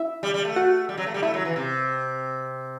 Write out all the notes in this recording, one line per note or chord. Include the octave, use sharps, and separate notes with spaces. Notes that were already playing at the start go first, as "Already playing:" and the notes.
Already playing: E4 E5
G3
G3
A3
F#4 F#5
G3
F#3
A3
G3
A3 E4 E5
F#3
E3
C3